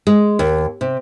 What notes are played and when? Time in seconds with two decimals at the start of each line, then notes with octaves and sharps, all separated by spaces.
0.07 G#3
0.39 D#2
0.81 C3